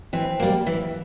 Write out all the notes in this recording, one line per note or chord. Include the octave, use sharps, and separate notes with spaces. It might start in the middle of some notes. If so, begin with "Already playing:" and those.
E3 C4
G3 A#3
E3